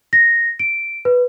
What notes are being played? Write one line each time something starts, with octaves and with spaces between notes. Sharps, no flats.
A#6
D7
B4